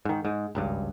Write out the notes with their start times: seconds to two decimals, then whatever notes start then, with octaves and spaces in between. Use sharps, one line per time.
0.05 G#2 D#3
0.25 G#2
0.55 G#1 C#2 G2